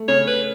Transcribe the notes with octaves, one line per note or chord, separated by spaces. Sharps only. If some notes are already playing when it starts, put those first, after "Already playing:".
Already playing: A3
C#3 C#5
B4